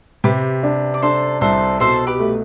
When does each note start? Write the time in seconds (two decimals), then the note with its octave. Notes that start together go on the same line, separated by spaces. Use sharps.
0.24 C3 G4 B4
0.63 D4
0.94 D5
1.02 D4 A4 C5
1.41 C2 A4 C5
1.80 B2 A4 C5
2.07 G4 B4
2.20 A3